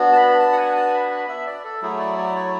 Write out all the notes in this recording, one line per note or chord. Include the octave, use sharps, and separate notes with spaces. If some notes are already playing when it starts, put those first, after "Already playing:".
Already playing: B3 D4 F#4
A5
B5
A5
F#5
G#5
A5
B5
B5
E5
D5
A4
F#3 A3 E4 G#4
D5
D5
C#5